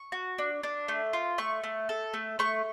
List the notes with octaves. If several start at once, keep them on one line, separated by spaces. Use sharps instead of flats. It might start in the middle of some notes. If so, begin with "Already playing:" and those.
Already playing: C#6
F#4
D4
D4
A3
F4
A3 C#6
A3
A4
A3
A3 C#6